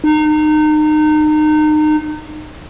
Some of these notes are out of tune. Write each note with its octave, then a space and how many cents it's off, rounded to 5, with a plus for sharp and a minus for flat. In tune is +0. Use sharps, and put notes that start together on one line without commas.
D#4 -30